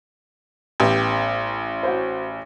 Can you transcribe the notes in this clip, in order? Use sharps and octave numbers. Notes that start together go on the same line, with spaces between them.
A1 B3 G4
F#4 C5